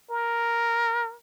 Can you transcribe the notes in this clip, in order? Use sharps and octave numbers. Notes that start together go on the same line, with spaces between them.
A#4